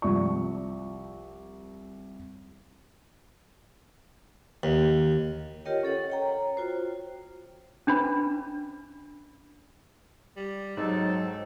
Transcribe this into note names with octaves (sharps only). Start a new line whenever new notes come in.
C2 F3 D5 C#6
D#2
F4 G4 A#4 C#5 D#5 G5
C#4 A4 C#5 F#5
C#5 G5 A#5
F4 F#4 C5
C#4 D4 B4 B5
G3
G#2 F#3 C4 D#4 A4